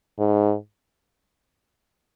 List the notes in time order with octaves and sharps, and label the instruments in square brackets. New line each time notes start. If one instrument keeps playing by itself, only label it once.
[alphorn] G#2